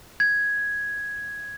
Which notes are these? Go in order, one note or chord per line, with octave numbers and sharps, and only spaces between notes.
G#6